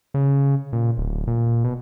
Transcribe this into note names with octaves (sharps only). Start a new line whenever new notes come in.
C#3
A#2
D1
A#2
B2